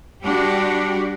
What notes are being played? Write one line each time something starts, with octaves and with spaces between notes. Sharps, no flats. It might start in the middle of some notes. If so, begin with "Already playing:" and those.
G3 D4 F#4 G4